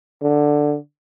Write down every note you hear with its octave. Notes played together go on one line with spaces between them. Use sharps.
D3